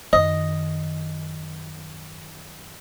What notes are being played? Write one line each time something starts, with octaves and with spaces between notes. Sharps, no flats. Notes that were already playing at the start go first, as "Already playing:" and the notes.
F#2 D#3 D#5